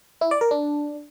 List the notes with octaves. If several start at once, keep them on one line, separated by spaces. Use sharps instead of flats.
E4
D5
A#4
D4